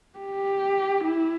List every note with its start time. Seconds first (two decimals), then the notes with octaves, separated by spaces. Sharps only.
0.19 G4
1.05 E4